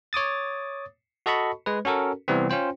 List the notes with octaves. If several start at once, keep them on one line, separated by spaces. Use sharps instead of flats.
C#5 D6 D#6 A6
F#4 A4 D#5 A5 B5 C#6
G#3 B4
C#4 F#4 A4 A#4
C3 E3 G3 B3 C4
C#4 F4 C5 G5